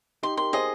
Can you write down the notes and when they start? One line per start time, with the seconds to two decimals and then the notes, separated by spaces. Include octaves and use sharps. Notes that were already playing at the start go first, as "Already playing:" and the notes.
0.23 D#4 G4 C6
0.37 G4 A#4 C6
0.53 G#4 C5 D#5